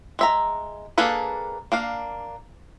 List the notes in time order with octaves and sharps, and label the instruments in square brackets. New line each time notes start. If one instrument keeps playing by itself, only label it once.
[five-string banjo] G#3 E5 A#5
A#3 D4 G#4 A4 B4
A#3 D4 F5